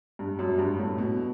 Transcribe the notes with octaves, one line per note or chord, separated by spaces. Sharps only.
G2
F#2
G2
A2
B2